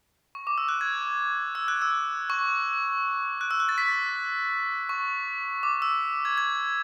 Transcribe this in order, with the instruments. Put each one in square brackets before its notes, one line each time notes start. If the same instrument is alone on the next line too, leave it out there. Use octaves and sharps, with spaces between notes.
[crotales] C#6
D6
E6
F#6
G#6
E6
F#6
E6
C#6
F#6
E6
F#6
A6
B6
C#6
D6
E6
G#6
G#6